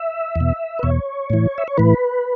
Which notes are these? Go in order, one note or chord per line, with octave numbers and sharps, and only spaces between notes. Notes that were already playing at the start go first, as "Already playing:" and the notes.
Already playing: E5
E2 B2
B4
E2 B2 C#5
A2 E3
E5
C#5
A2 E3 B4